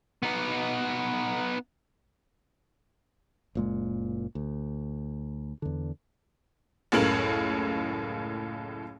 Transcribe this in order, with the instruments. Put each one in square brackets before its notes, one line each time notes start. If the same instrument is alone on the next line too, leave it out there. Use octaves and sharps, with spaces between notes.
[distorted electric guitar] B3 D#4
[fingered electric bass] F#1 A#2 G#3
D2
E2 D3
[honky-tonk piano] F#1 C#2 A2 A#4 F#7